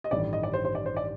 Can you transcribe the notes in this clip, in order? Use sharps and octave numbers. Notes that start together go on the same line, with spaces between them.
D#5
A1 G2 D#3 G3 D5
D#5
D5
C5
C5
D5
C5
D5